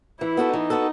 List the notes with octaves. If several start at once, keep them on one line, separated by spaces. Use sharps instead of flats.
E3 E4
B3 F#4 A4
E3 D#4
B3 F#4 A4